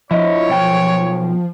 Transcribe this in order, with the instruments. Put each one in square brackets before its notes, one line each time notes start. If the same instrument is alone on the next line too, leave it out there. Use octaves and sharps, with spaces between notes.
[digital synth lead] F3 [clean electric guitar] E4 D#5 [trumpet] C#5
[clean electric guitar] B1 G5